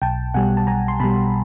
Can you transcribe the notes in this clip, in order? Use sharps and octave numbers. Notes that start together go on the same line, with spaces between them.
B1 G5 A5
B2 G3 F#5 G#5
A5
B1 G#5 A#5
C6
B2 G3 A5 B5